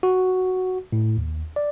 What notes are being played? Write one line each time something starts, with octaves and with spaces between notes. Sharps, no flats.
F#4
A2
D#2
D5